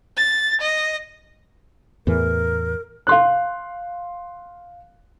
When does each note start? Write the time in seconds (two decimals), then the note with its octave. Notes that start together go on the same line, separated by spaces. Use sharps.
0.17 A6
0.61 D#5
2.07 E2 A2 E3 A#4
3.07 F5 C6 F#6